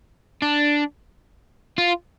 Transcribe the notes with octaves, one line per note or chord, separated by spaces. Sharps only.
D4
F4